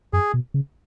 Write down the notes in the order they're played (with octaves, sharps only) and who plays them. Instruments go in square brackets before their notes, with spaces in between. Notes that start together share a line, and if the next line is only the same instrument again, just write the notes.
[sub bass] F#2 [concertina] G#4
[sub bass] B2
C#3